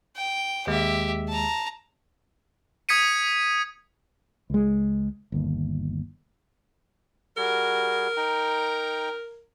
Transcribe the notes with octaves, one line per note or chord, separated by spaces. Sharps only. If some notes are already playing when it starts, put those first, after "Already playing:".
G5
D#2 G#3 G4 E5
A5 A#5
D#6 G#6 B6 C#7 D#7
C#2 G#3
G1 D#2
G3 F#4 G#4 A#4
D#4 G5 A#5